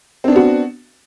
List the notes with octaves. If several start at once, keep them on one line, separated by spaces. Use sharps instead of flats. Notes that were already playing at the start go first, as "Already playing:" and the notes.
B3 C4 D4 F#4